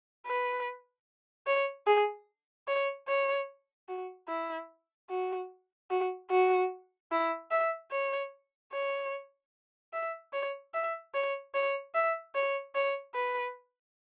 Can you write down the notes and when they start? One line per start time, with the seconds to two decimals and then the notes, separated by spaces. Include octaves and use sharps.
0.27 B4
1.47 C#5
1.87 G#4
2.67 C#5
3.08 C#5
3.88 F#4
4.29 E4
5.10 F#4
5.91 F#4
6.30 F#4
7.12 E4
7.51 E5
7.91 C#5
8.73 C#5
9.93 E5
10.33 C#5
10.74 E5
11.14 C#5
11.55 C#5
11.94 E5
12.35 C#5
12.75 C#5
13.15 B4